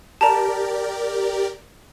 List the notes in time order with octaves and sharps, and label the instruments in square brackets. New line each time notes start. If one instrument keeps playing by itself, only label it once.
[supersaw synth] G4 A#4 D5 [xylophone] A5 A#5